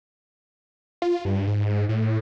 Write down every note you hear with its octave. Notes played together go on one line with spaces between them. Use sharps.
F4
G2
G#2
A2